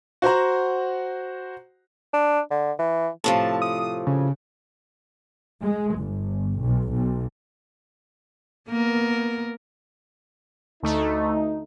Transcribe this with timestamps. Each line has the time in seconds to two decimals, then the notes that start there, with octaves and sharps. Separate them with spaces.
0.22 F#4 C5 F#5 A#5
2.14 D4
2.51 D3
2.79 E3
3.24 A2 C3 F3 A5
3.62 D#6
4.07 C#3
5.63 G#3
5.98 G1
6.63 B1
6.93 B1
8.69 A#3 B3 A#4
10.83 D2 A3 D#4